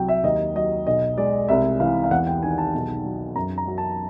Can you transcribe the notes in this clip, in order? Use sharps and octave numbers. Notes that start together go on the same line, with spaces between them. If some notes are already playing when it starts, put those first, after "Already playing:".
Already playing: C2 F#3 G5
E5
D#2 D#5
F#3 D#5
B1 D#5
G#3 D5
C2 E5
E3 F5
F5
E2 F#5
G5
D#3 G#5
A5
B1
F#3
F#2 A#5
A#5
F#3
A5